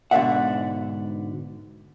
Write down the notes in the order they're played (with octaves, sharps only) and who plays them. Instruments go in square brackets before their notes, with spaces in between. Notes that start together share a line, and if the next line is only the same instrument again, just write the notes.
[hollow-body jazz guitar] G#2 B2 D3 D5 E5 F#5